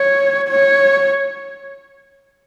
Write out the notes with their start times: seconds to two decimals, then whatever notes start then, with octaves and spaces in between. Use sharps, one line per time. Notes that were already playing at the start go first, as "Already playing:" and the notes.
Already playing: C#5
0.49 C#5